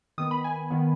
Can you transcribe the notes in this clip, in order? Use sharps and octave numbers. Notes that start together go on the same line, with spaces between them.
D#3 B3 D#6
B5
G#5
D#3 B3